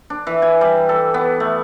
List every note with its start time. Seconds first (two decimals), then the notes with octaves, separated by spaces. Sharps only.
0.10 D4
0.27 E3
0.42 G#5
0.61 G3
0.89 A4
1.14 B3
1.40 A3